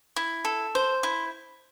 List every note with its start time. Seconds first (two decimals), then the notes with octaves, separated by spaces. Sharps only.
0.16 E4
0.45 A4
0.75 C5
1.03 E4